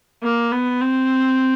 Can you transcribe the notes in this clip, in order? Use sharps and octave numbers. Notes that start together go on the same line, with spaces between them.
A#3
B3
C4